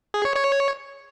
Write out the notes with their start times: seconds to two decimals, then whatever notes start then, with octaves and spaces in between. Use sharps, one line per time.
0.14 G#4
0.25 C#5
0.36 C#5